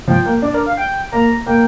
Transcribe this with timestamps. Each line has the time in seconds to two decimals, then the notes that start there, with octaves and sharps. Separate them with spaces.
0.08 F3 G5
0.26 A#3
0.42 D4 D5
0.54 A#4
0.66 F5
0.77 G5
1.12 A#3 A#5
1.46 A#3 G5